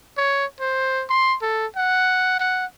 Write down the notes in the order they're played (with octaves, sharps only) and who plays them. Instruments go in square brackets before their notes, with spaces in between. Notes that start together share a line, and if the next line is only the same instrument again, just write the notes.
[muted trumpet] C#5
C5
C6
A4
F#5
F#5